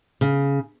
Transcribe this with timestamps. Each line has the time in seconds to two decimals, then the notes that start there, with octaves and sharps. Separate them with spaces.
0.21 C#3